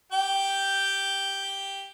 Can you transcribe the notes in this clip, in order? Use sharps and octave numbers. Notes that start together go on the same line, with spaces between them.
G4 G5